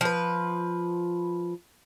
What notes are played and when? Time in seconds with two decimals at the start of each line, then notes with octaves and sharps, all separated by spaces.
0.01 F3 B4